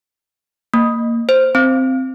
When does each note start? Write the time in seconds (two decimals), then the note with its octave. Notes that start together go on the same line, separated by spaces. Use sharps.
0.74 A#3
1.29 C5
1.55 C4